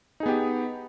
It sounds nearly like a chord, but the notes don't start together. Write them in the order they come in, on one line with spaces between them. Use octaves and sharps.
D#4 G#4 B3 G4